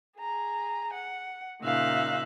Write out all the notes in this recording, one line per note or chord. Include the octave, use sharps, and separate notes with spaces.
G#4 A#5
F#5
A#2 C#3 D#4 E5 F5 F#6